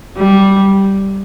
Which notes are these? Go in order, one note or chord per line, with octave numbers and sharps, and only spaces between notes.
G3